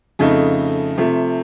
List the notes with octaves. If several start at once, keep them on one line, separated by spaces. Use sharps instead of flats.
F2 C#3 A3 D#4
C3 F3 A3